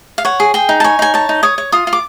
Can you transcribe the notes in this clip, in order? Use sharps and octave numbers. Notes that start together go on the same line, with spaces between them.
F5
C#5 F#5
G#4
G#4 G5
D#4
A5
C#5 G#5
D#4 G#5
C#5 A5
D#4
C#5 D#6
C#5
F4 D#6
F4
D6